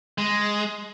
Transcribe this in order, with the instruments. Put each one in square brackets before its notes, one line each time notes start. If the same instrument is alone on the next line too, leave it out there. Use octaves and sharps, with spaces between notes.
[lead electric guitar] G#3